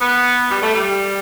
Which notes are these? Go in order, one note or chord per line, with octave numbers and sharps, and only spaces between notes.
B3
G3
A3
G3